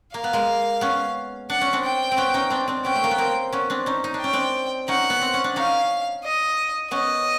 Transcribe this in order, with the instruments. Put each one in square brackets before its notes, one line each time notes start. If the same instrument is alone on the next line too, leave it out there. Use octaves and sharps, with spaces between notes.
[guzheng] A#3 [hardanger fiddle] F5
[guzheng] B3
G#3 A#3
B3 C#4
[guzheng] D4 [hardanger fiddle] F#5
[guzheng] C#4
C4 D4
[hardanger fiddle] G5
[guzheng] C4
B3 C#4
C#4 D#4
C4 D4
C4 D4
[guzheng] B3 C#4 [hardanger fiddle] G5
[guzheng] A3
A#3
B3
A#3 C4
B3 C#4
C4 D4
C#4 D#4
D#4
D4
[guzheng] C#4 [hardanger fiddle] G5
[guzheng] C4 D4
[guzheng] C#4 D#4 [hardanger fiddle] F#5
[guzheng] B3
C4
C#4
D4
[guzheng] C#4 D#4 [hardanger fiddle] F5
[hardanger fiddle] D#5
[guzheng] B3 C#4 [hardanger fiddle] D#5